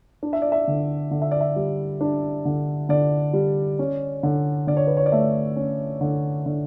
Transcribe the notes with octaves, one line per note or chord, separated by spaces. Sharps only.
D4
E5
D5
E5
D3
D3
E5
D5
E5
G3
D4
D3
D3 D5
G3
C#4
D3
D3 D5
C#5
B4
C#5
D5
A3 E5
C#4
D3
D3